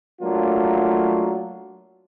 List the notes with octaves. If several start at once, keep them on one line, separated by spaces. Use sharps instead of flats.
F#3 A3 A#3 D4 F4